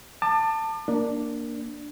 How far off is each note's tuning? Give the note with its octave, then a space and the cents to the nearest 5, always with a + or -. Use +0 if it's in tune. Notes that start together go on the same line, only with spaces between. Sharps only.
A5 +20 D6 +40
A#3 +0 D4 +0